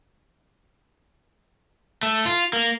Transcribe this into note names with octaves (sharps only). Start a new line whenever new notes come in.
A3
F4
A#3